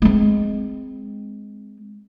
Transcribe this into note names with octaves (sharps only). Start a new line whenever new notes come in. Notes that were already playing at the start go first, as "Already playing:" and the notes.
G#3 C4